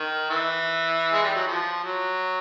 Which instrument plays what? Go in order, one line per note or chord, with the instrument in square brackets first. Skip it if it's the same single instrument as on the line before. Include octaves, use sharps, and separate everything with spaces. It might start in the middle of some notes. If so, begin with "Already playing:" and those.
Already playing: [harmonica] D#3
E3
G#3
G3
F#3
F3
F#3